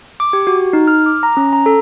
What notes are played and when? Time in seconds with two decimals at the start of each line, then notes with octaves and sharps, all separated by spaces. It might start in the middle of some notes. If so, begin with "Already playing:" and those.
0.20 D6
0.33 G4
0.47 F#4
0.73 D#4
0.88 F6
1.06 D6
1.23 A#5
1.37 C#4
1.53 A#5
1.66 A4